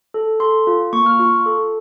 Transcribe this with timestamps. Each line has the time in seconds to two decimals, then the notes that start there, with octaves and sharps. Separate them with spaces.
0.14 A4
0.40 A4 C6
0.67 F4
0.93 A#3 C#6
1.06 F6
1.20 F4 C#6
1.46 A4